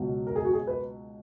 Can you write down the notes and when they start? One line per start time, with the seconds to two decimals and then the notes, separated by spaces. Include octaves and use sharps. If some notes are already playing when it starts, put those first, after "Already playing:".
Already playing: C#2 B2 F#3
0.27 A#4
0.36 G#4
0.45 F#4
0.53 G#4
0.67 B4